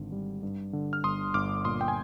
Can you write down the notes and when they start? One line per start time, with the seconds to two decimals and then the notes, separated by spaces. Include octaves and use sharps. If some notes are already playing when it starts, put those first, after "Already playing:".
Already playing: G#1 D3
0.12 G3
0.43 G2
0.73 D3
0.93 F6
1.04 G1 C6 D#6
1.34 G1 D6 F6
1.65 A#2 C6 D#6
1.81 G5
1.88 G#5